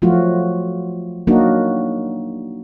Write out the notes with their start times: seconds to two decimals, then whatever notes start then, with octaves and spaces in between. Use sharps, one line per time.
0.02 F3 F#3 A3 F4 F#4
1.27 F#3 A#3 D4 D#4 F#4